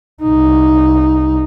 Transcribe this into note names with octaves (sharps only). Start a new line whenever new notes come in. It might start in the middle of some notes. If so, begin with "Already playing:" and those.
C2 D#4